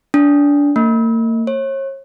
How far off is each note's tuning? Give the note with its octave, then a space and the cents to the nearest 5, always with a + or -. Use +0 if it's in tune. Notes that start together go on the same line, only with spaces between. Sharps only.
D4 -25
A#3 -40
C#5 -40